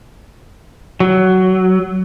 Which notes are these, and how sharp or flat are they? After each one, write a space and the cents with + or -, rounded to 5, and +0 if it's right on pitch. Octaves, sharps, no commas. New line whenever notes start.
F#3 +15